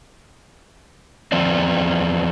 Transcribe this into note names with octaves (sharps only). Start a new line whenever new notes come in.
E2 F3 C4 D5